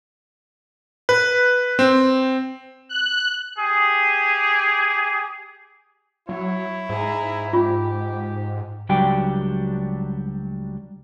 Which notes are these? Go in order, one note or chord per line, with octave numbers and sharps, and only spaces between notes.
B4
C4
F#6
G4 G#4
F#3 E4 C#5
G#2 G#4 A#5
F4 G4
C#2 F#3 G3 D4 G4 G5